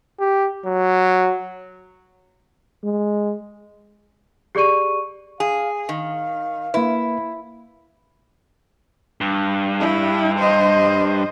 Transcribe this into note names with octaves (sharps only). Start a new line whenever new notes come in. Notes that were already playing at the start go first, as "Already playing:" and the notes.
G4
F#3
G#3
G4 G#4 D5 C#6 D#7
G#4 F5
D#3 F5
A#3 E4 B4
G2
E4
C5 D#5